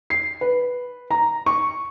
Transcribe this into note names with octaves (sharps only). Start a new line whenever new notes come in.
C7
B4
A#5
C#6